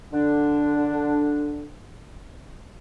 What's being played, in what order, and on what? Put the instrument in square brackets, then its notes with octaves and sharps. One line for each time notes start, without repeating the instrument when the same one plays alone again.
[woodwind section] D3 D4